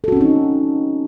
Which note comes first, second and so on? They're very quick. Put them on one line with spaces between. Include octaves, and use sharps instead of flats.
A4 F#4 C#4 C4 D#4